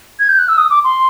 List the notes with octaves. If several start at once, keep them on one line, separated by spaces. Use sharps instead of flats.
G#6
G6
F#6
E6
D#6
D6
C6